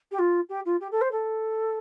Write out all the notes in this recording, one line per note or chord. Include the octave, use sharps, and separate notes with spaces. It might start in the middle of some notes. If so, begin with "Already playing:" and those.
G4
F4
G4
F4
G4
A4
C5
A4